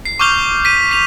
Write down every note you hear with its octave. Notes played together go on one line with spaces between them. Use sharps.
C7
C#6 D6 F6 G6 F7 G7
B6 D#7
B6 F7